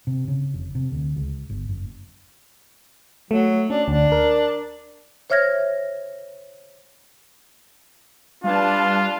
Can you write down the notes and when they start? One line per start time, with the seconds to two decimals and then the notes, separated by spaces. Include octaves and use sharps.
0.07 C3
0.28 C#3
0.54 F1
0.75 C3
0.92 D2
1.16 C#2
1.49 G1
1.69 F#1
3.31 F#3 A3
3.70 C#4 D4
3.88 D2 D4
4.12 A#4
5.30 C5 C#5 E5 F6 G#6 A#6
8.44 G3 D4 F4 B4 F5 A5